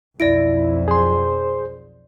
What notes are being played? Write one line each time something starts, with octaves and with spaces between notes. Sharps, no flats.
B1 F2 E4 D5 A#6 D7
G#4 C5 C6